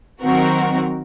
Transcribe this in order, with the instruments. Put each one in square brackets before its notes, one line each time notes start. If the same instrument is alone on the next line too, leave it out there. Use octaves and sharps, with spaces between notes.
[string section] D#3 F#3 C4 F#4 A#4